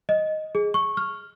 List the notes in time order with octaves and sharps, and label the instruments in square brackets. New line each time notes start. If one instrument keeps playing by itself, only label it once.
[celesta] D#5
G#4
C#6
F6